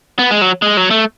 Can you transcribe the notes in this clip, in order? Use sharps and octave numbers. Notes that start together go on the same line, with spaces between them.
B3
G#3
F#3
G#3
F#3
A3